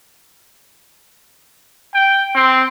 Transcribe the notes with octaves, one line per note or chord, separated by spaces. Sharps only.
G5
C4